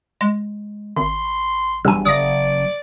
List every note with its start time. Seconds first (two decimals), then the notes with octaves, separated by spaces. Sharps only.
0.21 G#3
0.97 G#1 C6
1.85 E2 G2 F#3 G#5 E6
2.05 F#1 D5 D#6 A#6